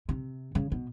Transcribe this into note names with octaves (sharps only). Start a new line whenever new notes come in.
C3
C#3
B2